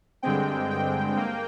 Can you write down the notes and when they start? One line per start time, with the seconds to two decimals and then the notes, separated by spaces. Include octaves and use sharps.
0.23 G2 D3 G#3 C4 G5
0.70 G5
1.17 A#3